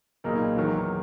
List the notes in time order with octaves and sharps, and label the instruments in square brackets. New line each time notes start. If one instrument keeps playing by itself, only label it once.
[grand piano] B1 A#2 A#3 D#4 G#4
E2 D#3 F#3